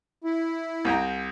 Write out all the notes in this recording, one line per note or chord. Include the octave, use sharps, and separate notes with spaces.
E4
C2 G5 A#5